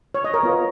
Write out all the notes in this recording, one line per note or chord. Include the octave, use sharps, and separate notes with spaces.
C#5
D#5
A#4 C#5
B3 F4